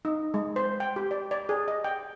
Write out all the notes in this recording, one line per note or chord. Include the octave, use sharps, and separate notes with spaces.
D#4
G#3
C5
G5
G4
D5
D5
G#4
D#5
G5